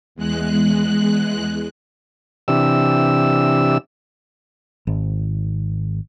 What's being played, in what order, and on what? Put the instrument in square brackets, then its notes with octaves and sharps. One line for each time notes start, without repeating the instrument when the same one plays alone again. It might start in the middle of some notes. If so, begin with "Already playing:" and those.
[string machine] E2 G#3 F#6
[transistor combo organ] C3 E3 D4 G4 E6
[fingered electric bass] G#1